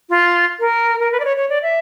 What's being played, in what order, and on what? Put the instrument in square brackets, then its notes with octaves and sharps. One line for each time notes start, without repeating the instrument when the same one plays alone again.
[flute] F4
A#4
A#4
B4
D5
C#5
C#5
D5
E5